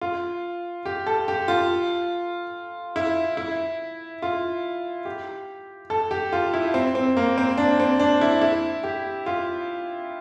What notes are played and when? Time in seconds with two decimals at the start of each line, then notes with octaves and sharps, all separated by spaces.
0.01 F4
0.86 G4
1.06 A4
1.28 G4
1.48 F4
2.96 E4
3.37 E4
4.22 F4
5.05 G4
5.90 A4
6.11 G4
6.33 F4
6.54 E4
6.74 C4
6.95 C4
7.17 A#3
7.38 C4
7.57 D4
7.80 C4
7.99 D4
8.21 E4
8.42 E4
8.84 G4
9.26 F4